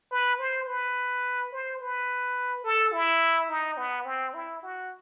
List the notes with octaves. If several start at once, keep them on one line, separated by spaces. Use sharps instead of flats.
B4
C5
B4
C5
B4
A4
E4
D#4
B3
C4
E4
F#4